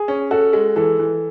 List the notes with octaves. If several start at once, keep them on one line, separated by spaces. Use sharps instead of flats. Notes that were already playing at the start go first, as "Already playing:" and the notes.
Already playing: G#4
C#4
F#4 A4
G#3
E3 A4
E3